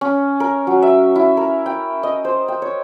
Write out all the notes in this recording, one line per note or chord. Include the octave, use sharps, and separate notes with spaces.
C#4
A#4
F#3
E5
E4
A#4
G5
D#5
C5
G5
C#5